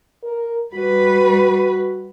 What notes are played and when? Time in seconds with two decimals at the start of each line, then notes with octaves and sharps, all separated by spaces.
0.23 A#4
0.74 G3 F#4 B4